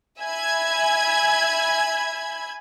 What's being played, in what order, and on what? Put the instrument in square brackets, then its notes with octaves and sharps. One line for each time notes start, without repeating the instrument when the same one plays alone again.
[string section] E5 G#5 B5 G#6